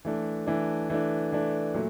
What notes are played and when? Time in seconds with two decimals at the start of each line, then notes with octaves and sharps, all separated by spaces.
0.05 E3 A3 D4
0.47 E3 A3 D4
0.90 E3 A3 D4
1.32 E3 A3 D4
1.74 A#2 F#3 A3